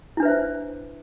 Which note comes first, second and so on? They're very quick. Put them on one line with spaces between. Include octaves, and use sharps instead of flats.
E4 D4 B4 E5 C5